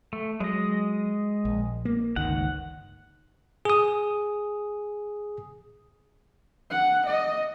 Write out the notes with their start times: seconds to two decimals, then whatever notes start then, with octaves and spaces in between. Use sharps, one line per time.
0.13 A3
0.40 F#3 G#3 D#5
1.45 A#1
1.85 A#3
2.16 G1 C#2 D#3 F#5
3.65 G#4 D#6
6.70 F#5
7.07 D#5